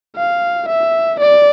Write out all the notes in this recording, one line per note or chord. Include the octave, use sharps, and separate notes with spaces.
F5
E5
D5